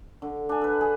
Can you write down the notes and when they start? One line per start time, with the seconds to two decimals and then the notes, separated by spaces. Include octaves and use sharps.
0.22 D3
0.49 D4 G#5
0.61 A4 B4
0.81 G#4